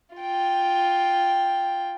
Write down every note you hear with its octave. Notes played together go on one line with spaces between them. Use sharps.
F4 G5